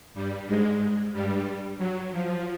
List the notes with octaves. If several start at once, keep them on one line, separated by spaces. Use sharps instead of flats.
G2 G3
G#2 G#3
G2 G3
F#3
F3